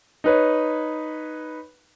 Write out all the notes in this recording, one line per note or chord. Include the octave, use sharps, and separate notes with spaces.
D#4 B4 C#5